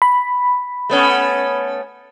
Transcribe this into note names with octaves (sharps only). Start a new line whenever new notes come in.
B5
A3 B3 C#4